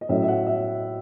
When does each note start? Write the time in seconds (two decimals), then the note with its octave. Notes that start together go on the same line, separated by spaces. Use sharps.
0.01 D#5
0.09 A2 F#3 C#4 E5
0.22 E5
0.28 F#5
0.47 E5